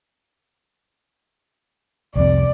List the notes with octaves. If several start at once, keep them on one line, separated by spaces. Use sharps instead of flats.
C2 F2 C3 D5